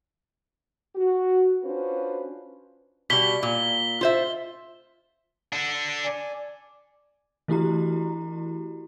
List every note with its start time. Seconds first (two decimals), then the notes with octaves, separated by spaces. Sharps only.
0.96 F#4
1.64 C#4 D4 F4 F#4 B4 C5
3.10 B2 G3 B6 G7
3.43 A#2
4.01 F4 C5 E5
5.53 D4 A4
6.05 D5 G#5
7.48 E3 A3 E4 F#4 G4 A#5